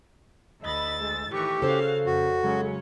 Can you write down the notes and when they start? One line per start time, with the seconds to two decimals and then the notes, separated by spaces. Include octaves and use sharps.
0.63 D2 D#5 B5 E6 A6
1.01 G#3
1.32 A2 D#3 E3 G4 C#6
1.62 C#3 F#4 A4 C5 C#5 F5
2.06 F2 F#4
2.43 C#3 F#3 G#3 C#4